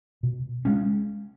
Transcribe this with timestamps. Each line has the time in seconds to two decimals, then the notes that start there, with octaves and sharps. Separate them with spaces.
0.23 B2
0.65 G#3 C#4